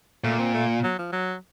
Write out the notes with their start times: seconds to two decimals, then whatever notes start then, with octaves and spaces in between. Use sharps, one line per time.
0.24 A#2 A3
0.39 C4
0.54 A3
0.83 F#3
0.99 F3
1.12 F#3